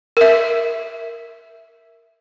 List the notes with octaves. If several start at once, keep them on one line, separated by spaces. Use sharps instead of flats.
A#4 E5